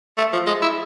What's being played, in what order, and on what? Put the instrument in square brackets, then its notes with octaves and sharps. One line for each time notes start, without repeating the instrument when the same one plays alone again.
[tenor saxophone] A3
F3
G#3
E4